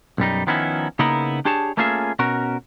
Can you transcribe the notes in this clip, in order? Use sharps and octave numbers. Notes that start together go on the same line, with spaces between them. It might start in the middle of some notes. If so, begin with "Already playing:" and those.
B1 F#2 G3 D#4
D#3 F3 B3 C#4 D#4 E4
C#3 A#3 B3 D#4 E4 A#4
D4 G4 G#4 C#5 A5
A3 A#3 C#4 F4 G#4 E5
B2 C#4 F#4 A#4